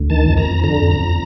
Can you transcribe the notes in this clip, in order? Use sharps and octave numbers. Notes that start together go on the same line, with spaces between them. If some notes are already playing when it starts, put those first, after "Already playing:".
Already playing: D2
D#3 A5
F2
A#5
F2
D3 A#5
F2
A#5
F2